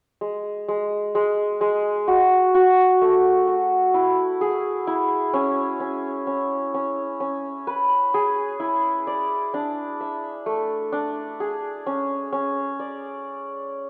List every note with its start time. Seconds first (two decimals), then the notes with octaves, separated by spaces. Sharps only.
0.21 G#3
0.68 G#3
1.15 G#3
1.61 G#3
2.08 F#4
2.55 F#4
3.02 A3
3.47 F#4
3.94 E4
4.41 G#4
4.87 E4
5.34 C#4
5.80 C#4
6.27 C#4
6.74 C#4
7.20 C#4
7.67 B4
8.14 G#4
8.60 E4
9.07 D5
9.54 D4
10.00 E5
10.46 A3
10.92 D4
11.40 G#4
11.87 C#4
12.33 C#4
12.79 D5